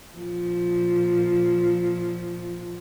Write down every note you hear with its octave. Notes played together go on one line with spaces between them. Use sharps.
A#2 F3